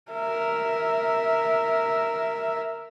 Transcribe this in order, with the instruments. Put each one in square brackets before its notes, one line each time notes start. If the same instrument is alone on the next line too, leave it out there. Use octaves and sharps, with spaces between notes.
[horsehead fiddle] A#4 E5